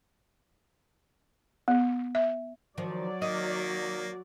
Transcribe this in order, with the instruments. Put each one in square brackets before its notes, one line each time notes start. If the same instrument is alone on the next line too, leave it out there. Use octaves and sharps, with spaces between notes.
[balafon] B3
E5
[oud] D#3 F3 [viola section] F#3 D5
[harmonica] D#3 A#3 [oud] D#5